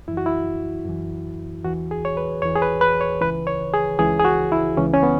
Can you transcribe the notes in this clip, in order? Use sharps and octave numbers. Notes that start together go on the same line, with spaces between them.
F#2 E3 E4
F#4
E4
F#2 E3
E2 E3 F#4
G#4
C#5
B4
E2 E3 C#5
G#4
B4
B4
C#5
C#2 C#3 E3 B4
C#5
G#4
C#2 C#3 E3 G#4
G#4
F#4
E4
C#2 C#3 E3 C#4
C#4
B3